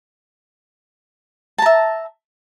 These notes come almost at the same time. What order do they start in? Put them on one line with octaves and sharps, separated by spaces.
A5 A#5 E5